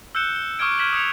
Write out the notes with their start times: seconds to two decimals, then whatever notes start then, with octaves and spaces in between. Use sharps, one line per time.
0.15 E6 F#6 G6 C#7 E7 G7
0.36 G7
0.59 C#6 D6 E6 F6 G#6 D7
0.79 F6 G#6 B6 E7 F#7
0.93 D#6 G#6 C#7 F7